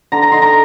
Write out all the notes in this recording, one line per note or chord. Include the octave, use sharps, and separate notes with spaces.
D3 A#5
A#5
D#4 C6
A#5